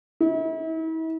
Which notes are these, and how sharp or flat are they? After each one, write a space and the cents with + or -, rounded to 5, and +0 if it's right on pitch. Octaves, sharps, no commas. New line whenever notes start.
E4 -40